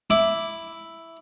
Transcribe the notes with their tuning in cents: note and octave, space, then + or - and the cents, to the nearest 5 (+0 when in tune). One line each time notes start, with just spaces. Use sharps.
E4 +0 D6 +0